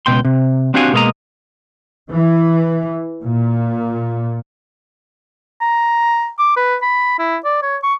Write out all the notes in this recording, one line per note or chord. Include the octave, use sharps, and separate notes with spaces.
C#2 G#2 B2 G5 C6
C3
C4 D4 F#4 G4 F5 G#5
B2 G#3 A#3 C#5 D#5 A#5
E3
A#2
A#5
D6
B4
B5
E4
D5
C#5
C#6